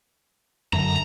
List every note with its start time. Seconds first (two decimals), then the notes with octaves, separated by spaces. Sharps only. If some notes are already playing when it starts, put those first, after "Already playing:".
0.73 F#2 D3 A#5